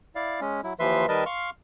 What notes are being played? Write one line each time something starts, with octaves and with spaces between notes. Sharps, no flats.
E4 D5 F5
G#3 C#4
F#3 E4
D#2 E3 F3 B4 E5 C6
D#3 G3 A#4 B4 D#5 A5
F5 C6 C#6 F6